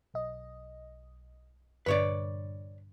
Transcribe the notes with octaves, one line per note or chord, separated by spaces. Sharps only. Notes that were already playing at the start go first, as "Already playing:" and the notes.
B1 D#5
A#1 G2 D3 B4 C#5 D5